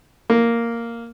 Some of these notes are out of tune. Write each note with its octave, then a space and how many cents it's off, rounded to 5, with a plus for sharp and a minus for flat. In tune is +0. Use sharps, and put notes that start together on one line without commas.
A#3 -5